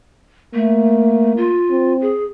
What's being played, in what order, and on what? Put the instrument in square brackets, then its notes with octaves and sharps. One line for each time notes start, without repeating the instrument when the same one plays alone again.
[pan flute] A3 [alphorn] A#3
[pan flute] F4
[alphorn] C4
[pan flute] G#4